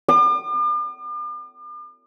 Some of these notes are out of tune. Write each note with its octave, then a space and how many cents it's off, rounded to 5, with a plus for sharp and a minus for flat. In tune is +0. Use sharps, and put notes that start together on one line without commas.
D6 +45